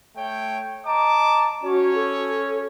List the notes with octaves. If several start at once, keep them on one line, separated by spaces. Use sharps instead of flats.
A3 C#5 G5
D#5 A5 A#5 D6
C#4 F#4 C#5
A4